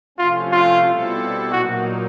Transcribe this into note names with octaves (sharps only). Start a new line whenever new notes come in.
C3 F3 A3 C#4 F4
F4
B2 G3 C4 E4 A4
A#2 F#3 A#3 D#4 F#4